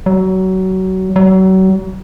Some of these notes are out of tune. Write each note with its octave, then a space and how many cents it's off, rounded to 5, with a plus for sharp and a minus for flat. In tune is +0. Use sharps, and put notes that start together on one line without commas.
F#3 +25
F#3 +35